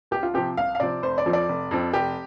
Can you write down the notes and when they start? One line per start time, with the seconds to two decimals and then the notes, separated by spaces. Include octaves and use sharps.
0.11 C2 G4
0.23 F4
0.34 C3 F3 C4 G4
0.57 C2 F5
0.75 F5
0.80 C3 F3 C4 D5
1.03 F1 C5
1.18 D5
1.26 F2 F3 C4
1.33 D5
1.49 F1
1.71 F2 F3 C4
1.93 F1 G4